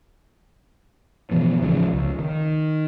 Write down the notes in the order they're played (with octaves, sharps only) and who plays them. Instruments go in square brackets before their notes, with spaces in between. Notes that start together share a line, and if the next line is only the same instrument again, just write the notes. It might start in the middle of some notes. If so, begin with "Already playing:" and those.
[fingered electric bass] B2 E3 F3 B3
A1 C#3 E3 F3
C#2
D#3